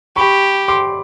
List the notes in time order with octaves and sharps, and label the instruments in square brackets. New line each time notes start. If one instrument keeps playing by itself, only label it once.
[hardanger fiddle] G4 [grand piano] B5 C#6
[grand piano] C6 D6